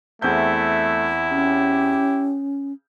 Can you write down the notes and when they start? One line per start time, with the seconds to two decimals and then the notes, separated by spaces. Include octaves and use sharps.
0.22 E2 A3 C4 E4 G6
1.29 C#4 G4